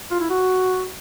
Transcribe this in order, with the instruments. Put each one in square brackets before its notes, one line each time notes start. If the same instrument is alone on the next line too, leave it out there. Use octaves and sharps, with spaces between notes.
[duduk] F4
E4
F#4